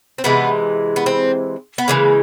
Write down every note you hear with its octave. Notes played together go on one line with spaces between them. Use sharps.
C4
C3 E3 G#3 B3
B3
C4
B3
C#3 E3 G#3 A#3